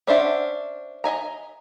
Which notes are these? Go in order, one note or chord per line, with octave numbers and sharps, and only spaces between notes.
C#4 D4 C5 E5 F#5
D#5 E5 G#5 A#5